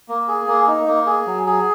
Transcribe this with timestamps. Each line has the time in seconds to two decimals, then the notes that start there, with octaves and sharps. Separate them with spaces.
0.09 A#3
0.28 G#4
0.47 A#3
0.68 D#4
0.87 A#3
1.06 G#4
1.27 F#3
1.46 G#4